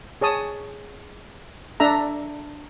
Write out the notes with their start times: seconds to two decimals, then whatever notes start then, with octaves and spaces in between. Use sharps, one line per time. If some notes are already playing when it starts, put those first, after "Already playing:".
0.21 G#4 C#5 A5 D#6
1.80 D4 A4 E5 A#5